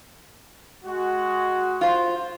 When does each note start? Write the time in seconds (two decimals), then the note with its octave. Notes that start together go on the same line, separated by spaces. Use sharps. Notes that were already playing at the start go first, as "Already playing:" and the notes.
0.83 G#3 F#4
1.81 F4 C5